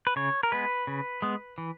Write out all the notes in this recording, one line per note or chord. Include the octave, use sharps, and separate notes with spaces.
B4
C#3 C#5
A#4
G#3 B3 B4
C#3
G#3 B3
E3